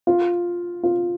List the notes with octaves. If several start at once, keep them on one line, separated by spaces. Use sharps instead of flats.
F4
F4